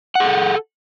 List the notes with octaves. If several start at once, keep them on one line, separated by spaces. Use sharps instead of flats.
G#4 A4 F#5